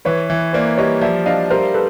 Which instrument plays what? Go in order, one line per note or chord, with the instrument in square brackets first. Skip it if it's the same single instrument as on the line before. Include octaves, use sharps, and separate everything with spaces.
[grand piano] E3 [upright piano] B4 C#5
[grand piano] E3
[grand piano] A#3 [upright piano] C5 D5
[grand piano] G3 [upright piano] C#5 D#5
[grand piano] F3 [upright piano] D5 E5
[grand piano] D4 [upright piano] D#5 F5
[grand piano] G3 [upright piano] A#4 C5
[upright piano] A4 B4